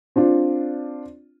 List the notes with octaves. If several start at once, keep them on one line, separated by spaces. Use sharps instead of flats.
C4 D4 F4